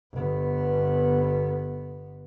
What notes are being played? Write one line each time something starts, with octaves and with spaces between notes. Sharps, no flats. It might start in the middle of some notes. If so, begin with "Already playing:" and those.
G1 B3